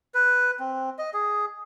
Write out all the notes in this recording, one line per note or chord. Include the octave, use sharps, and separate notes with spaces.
B4
C4
D#5
G#4